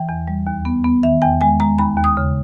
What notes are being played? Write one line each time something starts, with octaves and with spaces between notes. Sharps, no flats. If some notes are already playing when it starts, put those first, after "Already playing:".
Already playing: E3 G5
E2
G3
D#2
B3
B3
D#3 E5
E2 G5
G#3 G#5
G#3 A#5
D#2 B5
D#2
D#6
C#3